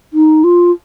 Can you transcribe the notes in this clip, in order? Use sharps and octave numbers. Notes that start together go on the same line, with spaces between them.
D#4
F4